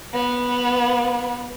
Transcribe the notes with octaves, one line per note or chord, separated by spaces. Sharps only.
B3